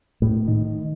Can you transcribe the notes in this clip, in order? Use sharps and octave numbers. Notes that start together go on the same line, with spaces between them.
A2
D#3